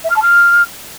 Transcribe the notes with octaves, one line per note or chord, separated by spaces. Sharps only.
E5
F6
A5
F6